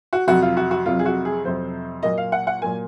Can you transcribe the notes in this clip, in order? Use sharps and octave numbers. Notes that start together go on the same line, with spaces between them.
F#4
F2 C3 F#3 F#4
F4
F#4
F#4
F2 C3 F#3 F4
G#4
F#4
G#4
F2 C3 F#3 C5
A#2 F#3 A#3 D#5
F5
F#5
F#5
A#2 F#3 A#3 G#5